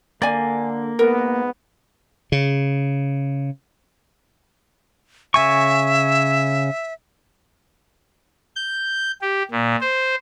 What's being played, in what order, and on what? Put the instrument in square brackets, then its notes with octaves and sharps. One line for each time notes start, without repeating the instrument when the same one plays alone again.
[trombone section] D3 [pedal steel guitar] A#3 [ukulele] D5 G#5
[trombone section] G#2 B3 [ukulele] A#4
[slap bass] C#3
[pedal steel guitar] C#3 G#5 C#6 [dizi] E5
[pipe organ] G6
G4
A#2
C5